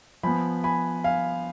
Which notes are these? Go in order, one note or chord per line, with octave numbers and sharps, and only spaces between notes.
F3 B3 G#5 B5
G#5 B5
F5 G#5